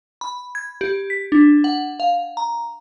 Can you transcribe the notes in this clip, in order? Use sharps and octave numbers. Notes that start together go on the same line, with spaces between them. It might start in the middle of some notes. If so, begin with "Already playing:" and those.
B5
G#6
G4
B6
D4
F#5
F5
A#5